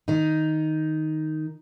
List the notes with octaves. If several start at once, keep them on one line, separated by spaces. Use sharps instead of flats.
D#3 D#4